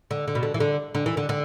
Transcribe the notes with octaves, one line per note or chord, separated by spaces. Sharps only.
D3
D3
B2
D3
E3
D3
D3
E3
D3
D3